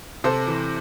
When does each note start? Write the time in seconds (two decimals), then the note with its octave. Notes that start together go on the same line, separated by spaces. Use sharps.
0.24 C3 A4 C5
0.47 E3